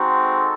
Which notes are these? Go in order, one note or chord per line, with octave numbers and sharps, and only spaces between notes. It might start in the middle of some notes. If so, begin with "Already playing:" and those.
Already playing: G#3 C4 D#4 F#4
A4